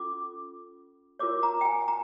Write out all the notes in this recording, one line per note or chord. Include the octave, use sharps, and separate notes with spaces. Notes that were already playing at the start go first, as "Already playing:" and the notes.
Already playing: C#4 F4 A4 D6
F4 A#4 C#5 D6
A#5
G5
G#5
A#5